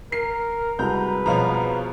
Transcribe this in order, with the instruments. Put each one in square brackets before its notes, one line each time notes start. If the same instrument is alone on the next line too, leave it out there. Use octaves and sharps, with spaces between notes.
[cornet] A#4 [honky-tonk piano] C7
[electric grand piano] C2 G#3 F#4 [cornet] B4 [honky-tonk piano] A#5 [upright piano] G6
[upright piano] E1 B2 F3 [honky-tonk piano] C#5 F5 A#5